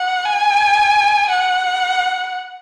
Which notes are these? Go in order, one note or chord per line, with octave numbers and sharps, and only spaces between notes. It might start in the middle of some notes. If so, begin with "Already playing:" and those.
Already playing: F#5
G#5
F#5